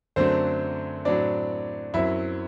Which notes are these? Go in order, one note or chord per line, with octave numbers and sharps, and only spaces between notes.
F#2 D3 F#3 A3 C4 D4 C5
A2 F#3 C4 D4 D5
F#2 F#3 C4 E4 E5